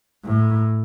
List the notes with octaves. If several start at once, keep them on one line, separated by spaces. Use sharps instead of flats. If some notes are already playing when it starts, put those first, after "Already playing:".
A2